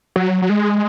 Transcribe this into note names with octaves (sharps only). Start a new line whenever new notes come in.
F#3
F#3
G#3